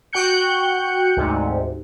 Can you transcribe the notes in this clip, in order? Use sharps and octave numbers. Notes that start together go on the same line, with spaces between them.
F#4 G5 F#6 G6 C#7
D2 G#2 C3